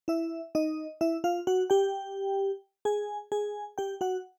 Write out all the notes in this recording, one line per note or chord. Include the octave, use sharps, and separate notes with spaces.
E4 E5
D#4 D#5
E4 E5
F4 F5
F#4 F#5
G4 G5
G#4 G#5
G#4 G#5
G4 G5
F#4 F#5